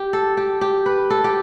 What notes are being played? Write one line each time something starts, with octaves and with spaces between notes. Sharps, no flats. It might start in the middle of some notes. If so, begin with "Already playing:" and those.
Already playing: G4
A4
G4
G4
B4
A4
G4